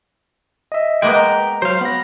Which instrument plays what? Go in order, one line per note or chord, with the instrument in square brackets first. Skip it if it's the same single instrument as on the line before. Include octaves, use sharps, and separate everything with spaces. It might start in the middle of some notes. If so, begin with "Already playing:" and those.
[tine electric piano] D#5 E5
[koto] G#3 A#3 B3 [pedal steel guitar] G5
[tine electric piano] A#5
[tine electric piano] F#3 [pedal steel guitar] C5 F5
[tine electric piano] B3 A#6 [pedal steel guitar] B5